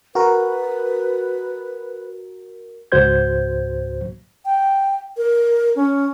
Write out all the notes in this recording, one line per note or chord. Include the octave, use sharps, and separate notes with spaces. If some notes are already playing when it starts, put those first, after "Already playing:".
F#4 A#4 B4
C#2 G#2 F#4 C5 G6 G#6
G5
A#4
C#4